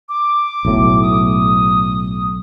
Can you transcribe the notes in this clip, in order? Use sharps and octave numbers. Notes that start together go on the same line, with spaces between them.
D6
B1 A2
D#6